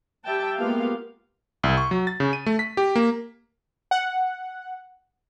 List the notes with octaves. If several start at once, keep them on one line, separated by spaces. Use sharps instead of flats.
G3 E5 G5 A5
G#3 A#3 B3 F4 G4 F5
C2
C#6
F#3
A6
C#3
D#7
A3
B6
G4
A#3
F#5